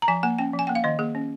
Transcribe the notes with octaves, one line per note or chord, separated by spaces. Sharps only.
A#5
F3 G#5
A#3 G#5
C#4 G5
F3
G#5
A#3 G5
F5
D#3 D#5
A#3 G#4
C#4